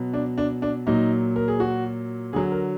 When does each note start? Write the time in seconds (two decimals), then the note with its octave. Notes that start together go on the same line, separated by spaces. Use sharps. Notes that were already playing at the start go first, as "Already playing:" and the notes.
Already playing: B2 F#3
0.14 D4
0.38 D4
0.62 D4
0.87 A#2 F#3 D#4
1.36 A#4
1.48 G#4
1.60 F#4
2.33 D3 F#3 G#4
2.52 A#4